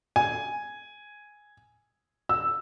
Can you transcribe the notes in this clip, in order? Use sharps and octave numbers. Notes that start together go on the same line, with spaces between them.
G#5
E6